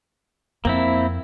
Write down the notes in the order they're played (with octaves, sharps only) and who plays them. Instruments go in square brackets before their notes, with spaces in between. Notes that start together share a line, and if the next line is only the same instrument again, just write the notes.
[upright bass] F2 [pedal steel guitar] A#3 C4 E4